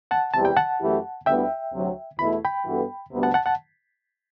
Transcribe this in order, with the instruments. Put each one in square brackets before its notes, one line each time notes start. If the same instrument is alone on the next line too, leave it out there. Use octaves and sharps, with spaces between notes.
[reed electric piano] F#5 A5
[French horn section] E2 C3 G3 [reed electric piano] A5
[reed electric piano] G5
F#5 A5
[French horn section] F#2 E3 A3 E4 G4
[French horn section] D2 D3 G3 B3 E4 [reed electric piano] E5 G5
[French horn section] D2 C3 F#3
[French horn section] E2 B2 A3 E4 [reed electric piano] B5
[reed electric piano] G5 B5
[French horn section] G2 E3 B3 F#4 A4
D2 C3 G3 B3
[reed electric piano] F#5 A5
F#5 A5
F#5 A5